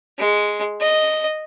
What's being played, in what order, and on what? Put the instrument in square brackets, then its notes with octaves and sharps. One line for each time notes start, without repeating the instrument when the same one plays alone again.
[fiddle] G#3
D#5